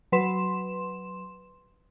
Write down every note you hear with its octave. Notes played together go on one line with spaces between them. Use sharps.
F#3 B4 C6 E7